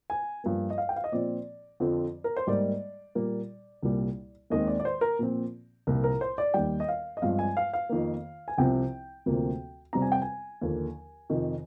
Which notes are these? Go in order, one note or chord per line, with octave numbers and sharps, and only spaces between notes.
G#5
G2 F3 A#3
D#5
F5
G5
F5
D#5
A#2 F3 C4 D5
F2 D3 F3 C4
A#4
C5
G#2 G3 A#3 D5
A#2 G3 A#3
C2 A#2 G3 A#3
D#2 D#3 G#3 C4 D#5
D5
D5
C5
A#4
A#2 F3 C4
C2 A#2 F3 A#3
A#4
C5
D5
D#2 D#3 G3 G5
D#5
F5
D#5
G2 F3 G#3 C4 F5
G#5
F5
F5
F2 D#3 A#3
G#5
C2 C3 F3 C4 G5
D2 C3 F3 A#3
F2 C3 G3 C4 A#5
G#5
G5
G#5
D#2 D3 F3 A#3
F2 C3 D#3